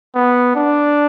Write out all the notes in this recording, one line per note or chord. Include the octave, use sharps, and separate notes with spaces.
B3
D4